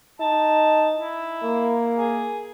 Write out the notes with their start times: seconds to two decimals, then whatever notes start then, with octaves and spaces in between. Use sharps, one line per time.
0.20 D#4 A5
0.97 E4
1.44 A#3
1.96 G#4